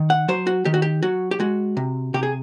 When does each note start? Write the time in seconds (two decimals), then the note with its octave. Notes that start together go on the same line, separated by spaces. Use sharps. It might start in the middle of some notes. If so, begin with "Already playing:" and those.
Already playing: D#3
0.10 F#5
0.28 F#3 C5
0.47 F#4
0.65 D#3 G4
0.74 F#4
0.82 G4
1.03 F#3 F#4
1.31 G4
1.40 G#3 F#4
1.77 C3
2.14 C3 G4
2.23 G#4